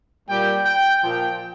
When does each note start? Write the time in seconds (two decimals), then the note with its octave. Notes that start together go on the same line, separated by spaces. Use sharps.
0.29 A#2 G3 G5
0.66 G5
1.02 A#2 F3 G5